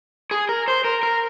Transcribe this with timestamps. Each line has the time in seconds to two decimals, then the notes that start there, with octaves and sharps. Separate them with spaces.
0.31 G#4
0.49 A#4
0.68 C5
0.84 A#4
1.03 A#4